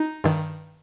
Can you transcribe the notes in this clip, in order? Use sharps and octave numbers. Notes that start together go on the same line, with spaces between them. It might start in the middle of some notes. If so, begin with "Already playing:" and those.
Already playing: D#4
G2 D#3